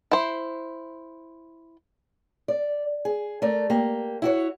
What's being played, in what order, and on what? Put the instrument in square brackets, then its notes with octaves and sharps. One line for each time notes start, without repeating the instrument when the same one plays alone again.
[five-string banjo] E4 C5
[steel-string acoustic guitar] D5
G#4
A3 A#4 D5
A#3 G4
E4 F#4 C#5